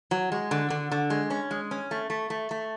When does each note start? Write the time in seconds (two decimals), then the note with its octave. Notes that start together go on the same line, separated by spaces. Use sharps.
0.11 F#3
0.32 G#3
0.51 D3
0.70 D3
0.92 D3
1.10 G#3
1.30 C#4
1.51 G#3
1.71 C#4
1.91 A3
2.10 A3
2.30 A3
2.51 A3